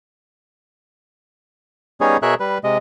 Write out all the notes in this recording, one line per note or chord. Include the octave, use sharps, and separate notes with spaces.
G3 B3 C#4 D#4 G#4 C#5
B2 G#4 A#4 C#5 E5 F#6
G3 B4
C3 G#3 D#5